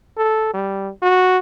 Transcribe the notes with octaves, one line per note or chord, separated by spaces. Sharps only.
A4
G3
F#4